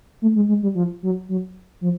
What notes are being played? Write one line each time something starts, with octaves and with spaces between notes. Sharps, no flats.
A3
G#3
G#3
G3
F3
F#3
F#3
F3